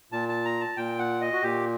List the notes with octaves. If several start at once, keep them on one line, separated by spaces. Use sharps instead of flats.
A#2 A5
A5
A#5
A5
A#2 G5
F#5
D#5
F#4
A#2 G4